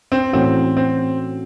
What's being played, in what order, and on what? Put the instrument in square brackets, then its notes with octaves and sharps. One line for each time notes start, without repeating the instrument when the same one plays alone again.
[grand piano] C4
[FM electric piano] A2 E3 A3 C#4 F#4 [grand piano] C4
[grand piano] C4